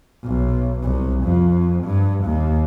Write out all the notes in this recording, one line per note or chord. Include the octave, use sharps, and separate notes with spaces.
B1
C2
F2
G2
D#2